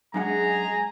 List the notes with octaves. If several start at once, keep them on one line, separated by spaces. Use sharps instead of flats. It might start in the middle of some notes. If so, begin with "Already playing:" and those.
F#2 G#3 D4 G#4 F#5 G#5 A#5